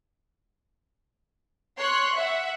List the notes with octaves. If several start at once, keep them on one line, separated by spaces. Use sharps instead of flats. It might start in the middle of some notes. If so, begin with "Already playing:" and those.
C#5 C6 F#6
E5 F#5